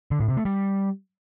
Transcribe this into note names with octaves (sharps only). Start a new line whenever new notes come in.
D3
A2
C3
A3
G3